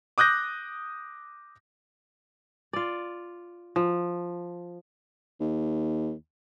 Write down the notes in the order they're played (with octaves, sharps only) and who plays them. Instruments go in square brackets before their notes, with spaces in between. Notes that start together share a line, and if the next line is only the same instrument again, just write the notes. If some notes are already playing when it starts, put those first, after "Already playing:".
[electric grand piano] D6 D#6 F#6 G6 A#6
[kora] F4 D5
F3
[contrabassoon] D#2